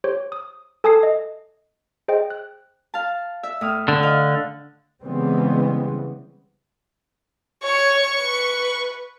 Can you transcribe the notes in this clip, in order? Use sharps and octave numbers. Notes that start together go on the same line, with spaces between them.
G4 C5 C#5
D#6
A4 G#5 A5 D#6 G#6 C7
D#5
G#4 C5 D#5 G5
F#6
F5 A5
E5
A2 D#6 F6
D3
D#5 F5
C#3 E3 G3 G#3 B3 C4
C#5 C#6
B4